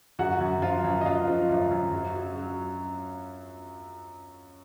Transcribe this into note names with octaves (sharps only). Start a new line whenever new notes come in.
F#2 F#4 F#5
F#2
F3 F4 F5
F#2
D#5
F#2 F4 F5
F3
F#2
F#2
F#3
F#3
F#3